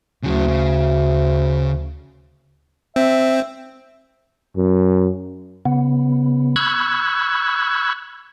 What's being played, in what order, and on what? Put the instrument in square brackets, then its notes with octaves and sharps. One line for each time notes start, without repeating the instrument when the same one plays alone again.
[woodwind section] D2 [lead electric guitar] C#3 F#3
[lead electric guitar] C#3
[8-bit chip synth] C4 [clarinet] E5
[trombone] F#2
[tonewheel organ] C#3 B3
B5 C#6 E6 F#6 G#6